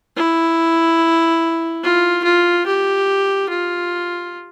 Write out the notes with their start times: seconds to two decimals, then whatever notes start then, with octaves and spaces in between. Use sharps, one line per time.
0.17 E4
1.83 F4
2.24 F4
2.66 G4
3.49 F4